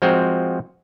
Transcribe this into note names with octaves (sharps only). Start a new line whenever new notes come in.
F3 G#3 C4 F#4